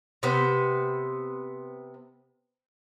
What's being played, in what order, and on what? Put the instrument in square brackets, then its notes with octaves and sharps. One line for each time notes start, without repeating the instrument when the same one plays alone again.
[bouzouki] C3 B3 B4 C5